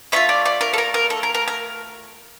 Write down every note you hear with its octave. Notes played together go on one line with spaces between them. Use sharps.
A3 D4 F4 E5
D5
D5
A#4
A4
A#4
A#4
A4
A#4
A#4
A#4